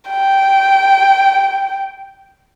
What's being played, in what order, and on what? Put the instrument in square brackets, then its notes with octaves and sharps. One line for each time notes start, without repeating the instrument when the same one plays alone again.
[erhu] G5